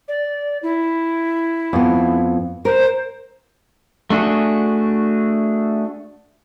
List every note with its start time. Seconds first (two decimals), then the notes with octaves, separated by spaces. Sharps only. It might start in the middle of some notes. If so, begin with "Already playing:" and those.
0.08 D5
0.63 E4
1.73 F2 B3
2.65 A#4 C5
4.10 A3 D4 F#4 G#4